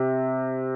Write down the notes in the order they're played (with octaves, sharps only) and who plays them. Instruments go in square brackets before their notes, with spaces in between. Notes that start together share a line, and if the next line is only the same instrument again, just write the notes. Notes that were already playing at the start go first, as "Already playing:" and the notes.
Already playing: [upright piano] C3